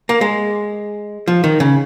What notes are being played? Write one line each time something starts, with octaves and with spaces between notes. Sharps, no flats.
A#3
G#3
F3
D#3
C#3